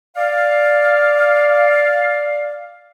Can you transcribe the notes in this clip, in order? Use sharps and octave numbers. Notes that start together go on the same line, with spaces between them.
D5 F5